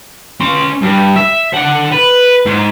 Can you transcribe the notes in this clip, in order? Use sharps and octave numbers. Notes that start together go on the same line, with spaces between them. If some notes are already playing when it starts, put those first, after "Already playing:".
C#4 C6
G2
E5
D4 F#5
B4
G#2